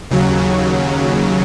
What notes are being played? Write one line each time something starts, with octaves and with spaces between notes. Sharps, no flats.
D#2 C#3 F#3